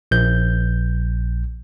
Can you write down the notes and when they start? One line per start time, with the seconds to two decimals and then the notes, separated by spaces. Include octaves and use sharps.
0.11 A#1 G6